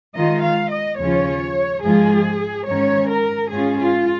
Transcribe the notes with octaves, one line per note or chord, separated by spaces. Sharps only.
D#3 G#3 F4 D#5
F5
D#5
D#2 C#3 F3 C#4 F4 C#5
G#2 F3 G#3 F4 G#4
G#2 D#3 C#4 C#5
A#4
G#2 G#3 C#4 F4 G#4
F4